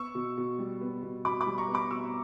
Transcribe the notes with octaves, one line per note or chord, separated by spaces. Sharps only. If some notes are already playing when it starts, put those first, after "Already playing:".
Already playing: B3 C#6 E6
B2
B2
G3
B3
B2
B2 B5 D6
B5 D6
G3
A#5 C#6
B3
B5 D6
B2 C#6 E6